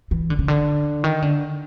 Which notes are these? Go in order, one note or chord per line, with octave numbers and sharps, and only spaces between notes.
E3
D3
C#3
D3
D#3
D3